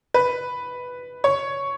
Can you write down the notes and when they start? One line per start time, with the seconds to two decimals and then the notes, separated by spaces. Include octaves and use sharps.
0.14 B4
1.24 C#5